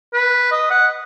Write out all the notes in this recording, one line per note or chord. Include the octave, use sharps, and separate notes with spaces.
B4
D#5
F#5